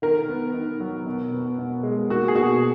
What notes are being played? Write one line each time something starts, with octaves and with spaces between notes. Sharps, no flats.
D#3 A#4
B3
D#3
F#3
B2
B3
B2
G#3
A#3 F#4
G#4
B2 F#4